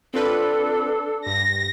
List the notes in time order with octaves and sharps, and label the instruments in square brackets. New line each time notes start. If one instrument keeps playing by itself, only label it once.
[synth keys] C4 F4 B4 [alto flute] D4 [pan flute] A4
[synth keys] G2 [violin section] A#6